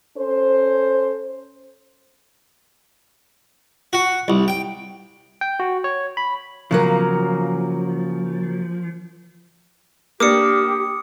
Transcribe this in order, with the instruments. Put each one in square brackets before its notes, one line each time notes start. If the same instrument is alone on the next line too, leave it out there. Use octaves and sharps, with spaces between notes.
[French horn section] C#4 A4 C5
[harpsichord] F#4
C2
G5
[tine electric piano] G5
F#4
C#5
B5
[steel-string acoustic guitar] C#3 F#3 A#3 [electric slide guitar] F3
[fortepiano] A#3 D4 [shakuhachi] G4 [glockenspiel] D6 D#6 C#7